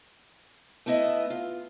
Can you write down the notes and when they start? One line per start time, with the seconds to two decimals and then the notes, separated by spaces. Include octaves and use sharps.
0.86 A3 B3 E4 D#5
1.30 F4